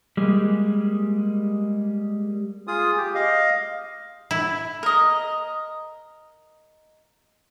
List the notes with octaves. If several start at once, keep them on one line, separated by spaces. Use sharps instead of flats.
G3 G#3 A#3
F4 G#4 D#6
G4
D#5 F5
E4
A#4 D#5